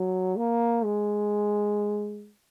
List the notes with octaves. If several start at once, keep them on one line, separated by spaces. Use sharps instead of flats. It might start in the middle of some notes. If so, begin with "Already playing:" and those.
Already playing: F#3
A#3
G#3